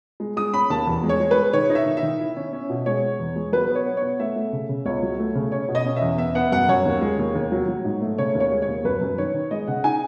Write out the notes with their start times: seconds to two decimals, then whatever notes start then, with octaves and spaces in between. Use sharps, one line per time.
0.20 G#3
0.37 G#3 D#6
0.54 C#4 B5
0.70 D#2 A5
0.87 E2
1.03 G#3
1.09 C#5
1.20 G#3
1.31 B4
1.36 G#3
1.53 D#3 C#5
1.70 D#4
1.75 E5
1.86 D#3
1.97 E5
2.03 D#3
2.20 E4
2.36 C#4
2.53 C#4
2.70 B2
2.86 G#3 C#5
3.03 G#3
3.20 E2
3.36 G#3
3.52 F#3 B4
3.70 B3
3.75 C#5
3.86 B3
3.97 C#5
4.03 B3
4.19 A3 E5
4.36 A3
4.53 C#3
4.69 C#3
4.86 C#2 C#5
5.03 F#3
5.19 A3
5.35 C#3
5.52 C#4 C#5
5.68 B2
5.75 D#5
5.86 C#4
5.96 E5
6.02 E2
6.18 B3 E5
6.35 B3 F#5
6.52 F#2 F#5
6.69 F#2 C#5
6.85 D#2
7.02 G#3
7.19 D#2
7.35 D#2
7.52 F#3
7.68 F#3
7.85 G#2
8.01 A3
8.18 C#3 C#5
8.35 D#2
8.40 C#5
8.52 G#3
8.62 C#5
8.68 D#2
8.85 F#2 B4
9.01 F#2
9.18 D#3 C#5
9.34 D#3
9.51 G#3 D#5
9.67 C#3 F#5
9.84 D#4 G#5